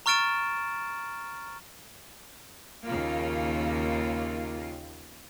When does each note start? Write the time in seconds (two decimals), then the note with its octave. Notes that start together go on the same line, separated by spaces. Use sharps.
0.06 A#5 C#6 F6 A6 D7 E7
2.86 D#2 C#3 A#3 F4